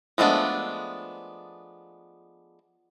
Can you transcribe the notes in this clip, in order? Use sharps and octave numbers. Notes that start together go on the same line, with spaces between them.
F3 G#3 A3 B3 D4